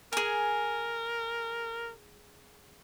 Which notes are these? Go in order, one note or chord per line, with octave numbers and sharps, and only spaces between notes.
G#4 A#4 G#5